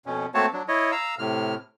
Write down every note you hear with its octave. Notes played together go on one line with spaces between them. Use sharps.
F2 B2 C#4
A3 A#3 C4 F#4 C#5 A5
F#3 D4
E4 C#5 D#5
F5 A#5 E6
A2 C3 F6